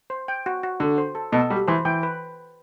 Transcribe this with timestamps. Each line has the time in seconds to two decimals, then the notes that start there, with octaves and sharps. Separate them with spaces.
0.10 C5
0.28 G5
0.46 F#4
0.63 F#4
0.80 D3 F#4
0.98 C5
1.15 A4
1.32 B2 A4
1.50 G3 F#4
1.68 E3 C5
1.85 E3 G5
2.03 B4